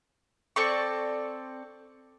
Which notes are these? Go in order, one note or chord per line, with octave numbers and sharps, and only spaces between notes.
C4 A4 D5 C#6